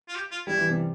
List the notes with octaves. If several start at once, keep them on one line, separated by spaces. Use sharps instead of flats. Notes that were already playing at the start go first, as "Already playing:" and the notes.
F4
G4
F4
G3 E4
E3
C3